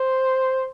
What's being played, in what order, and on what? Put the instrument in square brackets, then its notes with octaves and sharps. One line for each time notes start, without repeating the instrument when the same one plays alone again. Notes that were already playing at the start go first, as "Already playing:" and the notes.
Already playing: [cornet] C5